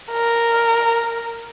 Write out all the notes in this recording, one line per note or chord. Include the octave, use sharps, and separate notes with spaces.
A#4